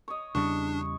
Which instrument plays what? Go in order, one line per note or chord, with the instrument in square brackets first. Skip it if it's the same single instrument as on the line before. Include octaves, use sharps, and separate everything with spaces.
[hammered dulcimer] C#5 D#5
[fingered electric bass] E2 C#3 G3 [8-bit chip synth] D4 [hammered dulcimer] C#6